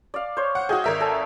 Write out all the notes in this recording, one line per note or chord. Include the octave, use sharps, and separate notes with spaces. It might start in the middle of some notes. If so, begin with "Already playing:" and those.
D5 F5
C5 C#5
F#5
F#4 G#4 D#5 G5
G#1 A#4 E5
A4 G#5 A5